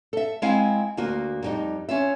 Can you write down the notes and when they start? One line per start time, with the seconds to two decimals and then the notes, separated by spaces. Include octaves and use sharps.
0.13 A4 E5
0.42 G#3 C4 E4 F5 G#5
0.97 D2 A#3 F4 F#4
1.42 F2 G3 D#4
1.89 C#4 F4 E5